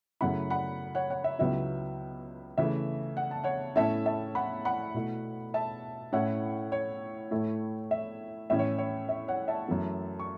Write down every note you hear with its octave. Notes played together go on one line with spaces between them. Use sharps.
F#2 C#3 A3 E4 F#5 B5
F#5 B5
C#5 F#5
C#5 F#5
E5
C#2 C#3 F#3 B3 E4 E5
C#3 E3 A3 E5
F#5
A5
C#5 F#5
A2 A3 C#4 E4 E5 A5
E5 A5
F#5 B5
F#5 B5
B2 A3 E4
E5 A5
A2 A3 C#4 E4 C#5 F#5
C#5
A2 A3 E4
E5
A2 E3 C#4 E4 E5
C#5
C#5
E5
C#5 F#5
E5 A5
F#2 E3 A3
C#6